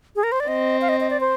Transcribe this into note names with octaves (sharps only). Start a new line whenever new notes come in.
G#4
A#4
C5
D5
C4 D#5
F5
D#5
D#5
D5
C5